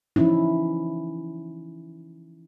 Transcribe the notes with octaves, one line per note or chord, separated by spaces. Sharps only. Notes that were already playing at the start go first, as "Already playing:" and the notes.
E3 F3 C#4 D#4 E4